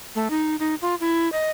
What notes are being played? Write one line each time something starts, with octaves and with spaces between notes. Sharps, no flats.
A3
D#4
D#4
F4
E4
D#5